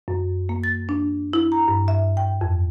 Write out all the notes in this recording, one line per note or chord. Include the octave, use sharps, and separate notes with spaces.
F#2
A#3
A6
D4
E4
A#5
G2
E5
G5
F2